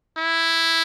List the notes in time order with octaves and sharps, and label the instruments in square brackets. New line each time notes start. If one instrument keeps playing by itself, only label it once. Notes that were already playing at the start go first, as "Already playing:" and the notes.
[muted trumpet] E4